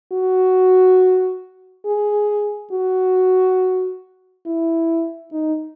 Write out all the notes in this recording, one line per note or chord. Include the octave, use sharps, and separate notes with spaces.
F#4
G#4
F#4
E4
D#4